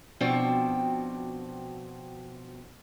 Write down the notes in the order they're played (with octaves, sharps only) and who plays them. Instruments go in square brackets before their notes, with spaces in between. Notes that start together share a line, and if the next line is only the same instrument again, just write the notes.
[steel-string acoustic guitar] B2 F3 C4 D4 F#4 G5